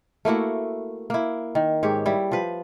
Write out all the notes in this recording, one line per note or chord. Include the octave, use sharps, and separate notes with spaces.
A3 A#3 E4 F#4
A#3 E4
D#3
G#2 G4 C#5
G3 E4
F3 B4